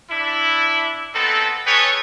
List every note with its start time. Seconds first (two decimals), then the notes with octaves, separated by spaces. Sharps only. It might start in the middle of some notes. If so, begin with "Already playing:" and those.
0.11 D4 E4
1.13 B3 C4 D#4 A4
1.66 G#4 A4 B4 C#5 G5